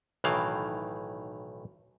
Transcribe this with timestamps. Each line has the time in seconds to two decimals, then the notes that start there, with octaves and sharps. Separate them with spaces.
0.24 B1 A2 D#3 E3 F5